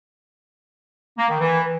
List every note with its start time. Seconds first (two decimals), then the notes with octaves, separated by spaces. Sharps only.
1.18 A#3
1.29 D#3
1.40 E3